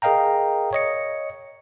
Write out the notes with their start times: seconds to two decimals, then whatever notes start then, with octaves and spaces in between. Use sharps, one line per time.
0.02 G#4 A#4 D#5 F5 G5 A#5
0.73 C#5 D#5 C#7